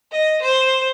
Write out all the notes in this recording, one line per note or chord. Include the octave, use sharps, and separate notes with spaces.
D#5
C5